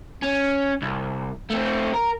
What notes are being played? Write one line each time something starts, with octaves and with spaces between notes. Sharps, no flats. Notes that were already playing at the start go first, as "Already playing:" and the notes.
C#4
C2
A3 C4
A#4